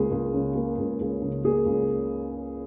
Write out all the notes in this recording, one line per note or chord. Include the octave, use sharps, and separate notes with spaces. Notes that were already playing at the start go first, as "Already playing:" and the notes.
Already playing: C#2 A#3 G#4
C#2
C#3
A#3
C#2
C#2
C#3
A#3 G#4
C#2